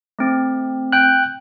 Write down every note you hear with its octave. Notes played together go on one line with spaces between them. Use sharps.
A3 C4
G5 F#6